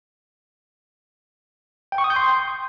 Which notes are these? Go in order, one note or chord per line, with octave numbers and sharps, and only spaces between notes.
G5
C#6
D#6
G6
C6